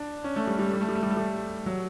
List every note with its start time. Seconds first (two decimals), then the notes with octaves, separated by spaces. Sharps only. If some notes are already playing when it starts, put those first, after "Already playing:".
Already playing: D4
0.24 C#4
0.36 A3
0.47 G3
0.59 G3
0.67 A3
0.73 G3
0.81 A3
0.89 G3
0.95 A3
1.03 G3
1.11 A3
1.17 G3
1.66 F#3